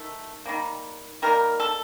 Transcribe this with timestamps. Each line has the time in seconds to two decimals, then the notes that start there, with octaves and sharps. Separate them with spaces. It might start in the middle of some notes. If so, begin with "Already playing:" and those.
Already playing: D#3 A3
0.46 D#3 G3 A#3
1.22 D#3 G3 A#3 A#4
1.60 A4